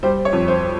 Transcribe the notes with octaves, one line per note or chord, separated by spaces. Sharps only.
G3 C5
C#5
F2
C5